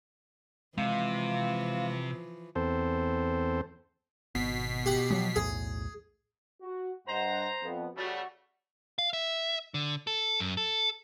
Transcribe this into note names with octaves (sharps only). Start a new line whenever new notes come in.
C3 E3 F3 G#3 F5
E2 C4 A4 C5
G#1 B2 B6 C7
G4 F#5
F3 F#3 G#3
B1 E2 A2 G#4
F#4
G2 C5 D#5 F#5 A#5
F2 B3
C#3 G3 A3 F#4
F5
E5
D3
A4
F#2
A4